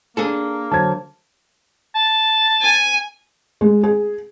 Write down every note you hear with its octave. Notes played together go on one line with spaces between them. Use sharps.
A#3 D4 G#4 A4
D3 F#3 C5 A5 G#6
A5
G#5
G#3
G#4